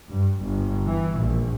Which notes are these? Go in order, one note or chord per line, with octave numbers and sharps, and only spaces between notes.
G2
G1
E3
A#1